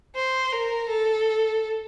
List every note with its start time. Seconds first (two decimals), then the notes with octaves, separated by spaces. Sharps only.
0.16 C5
0.52 A#4
0.89 A4